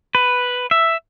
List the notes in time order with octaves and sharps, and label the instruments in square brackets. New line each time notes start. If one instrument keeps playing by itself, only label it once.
[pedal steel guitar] B4
E5